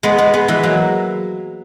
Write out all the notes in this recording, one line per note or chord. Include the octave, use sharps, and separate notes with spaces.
G#3 B3
G#3 B3
G#3 B3
E3 G#3
F#3 A#3